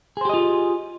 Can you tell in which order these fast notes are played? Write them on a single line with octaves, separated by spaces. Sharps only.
G#4 C5 G4 D#5 F4